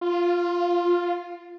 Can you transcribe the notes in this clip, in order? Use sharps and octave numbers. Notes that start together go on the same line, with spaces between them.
F4